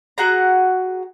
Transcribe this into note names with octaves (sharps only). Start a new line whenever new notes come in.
F#4 G#4 F#5 A#5